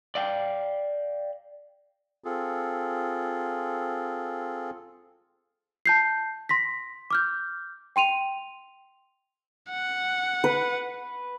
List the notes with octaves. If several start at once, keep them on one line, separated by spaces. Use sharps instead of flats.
D5 F5 G5
C4 F4 G#4 A4
A5 G6 C7
C6 A#6 B6
D6 F6 G6
G5 C6 D#7 F7
F#5
B4